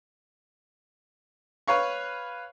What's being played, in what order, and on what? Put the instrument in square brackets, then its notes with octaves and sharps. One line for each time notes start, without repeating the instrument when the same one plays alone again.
[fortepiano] B4 C#5 F5 C#6